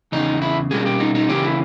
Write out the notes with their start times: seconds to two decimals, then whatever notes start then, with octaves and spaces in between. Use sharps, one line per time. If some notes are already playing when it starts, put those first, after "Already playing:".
0.12 E2 C#3 D#4
0.42 E4
0.71 B2 G3 A#3 C#4 G#4
0.86 G4
1.00 D#4
1.15 D#4
1.29 C#3 E3 A#3 C#4 G4
1.44 E4